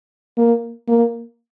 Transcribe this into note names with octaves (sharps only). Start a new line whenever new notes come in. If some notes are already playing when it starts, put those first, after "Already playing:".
A#3
A#3